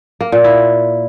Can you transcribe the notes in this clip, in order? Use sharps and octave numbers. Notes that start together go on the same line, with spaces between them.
A#3
A#2
E4